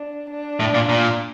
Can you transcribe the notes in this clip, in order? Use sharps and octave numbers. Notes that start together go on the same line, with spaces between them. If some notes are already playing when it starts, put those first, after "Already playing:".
Already playing: D4
D4
A2
A#2
A#2